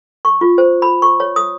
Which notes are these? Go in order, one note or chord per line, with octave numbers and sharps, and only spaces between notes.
C#6
F4
C5
B5
C#6
C#5
D#6